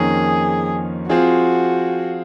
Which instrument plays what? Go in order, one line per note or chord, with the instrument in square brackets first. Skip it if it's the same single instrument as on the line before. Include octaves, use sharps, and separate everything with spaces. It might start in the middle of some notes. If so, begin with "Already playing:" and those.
Already playing: [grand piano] F2 D#3 A#3 C#4 [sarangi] G#4
[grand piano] F3 C4 F4 G#4 [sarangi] F#4